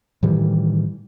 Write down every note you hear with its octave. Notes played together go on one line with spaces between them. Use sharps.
A2 D#3 E3 G3